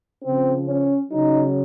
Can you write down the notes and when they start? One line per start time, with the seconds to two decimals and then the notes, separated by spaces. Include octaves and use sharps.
0.23 C#3 F3 C4
0.67 C#4
1.11 C#3 F#3 D#4